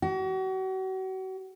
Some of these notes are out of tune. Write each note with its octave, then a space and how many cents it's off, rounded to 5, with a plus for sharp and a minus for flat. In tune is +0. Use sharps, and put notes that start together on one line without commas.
F#4 +35